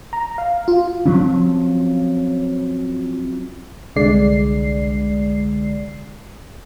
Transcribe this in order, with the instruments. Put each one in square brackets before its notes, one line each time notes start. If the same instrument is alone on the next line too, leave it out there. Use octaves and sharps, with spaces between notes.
[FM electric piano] A#5
F5
F4
[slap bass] F3 F#3 C4 C#4
[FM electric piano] C2 D3 G#3 D5 C7